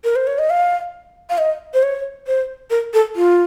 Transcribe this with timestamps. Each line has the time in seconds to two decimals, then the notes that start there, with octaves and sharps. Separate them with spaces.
0.04 A#4
0.16 C5
0.27 C#5
0.39 D#5
0.50 F5
1.30 F5
1.38 D#5
1.74 C5
1.83 C#5
2.27 C5
2.70 A#4
2.94 A4
3.16 F4